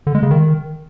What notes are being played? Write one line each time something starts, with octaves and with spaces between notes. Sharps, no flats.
D3
G#3
C#3
D#3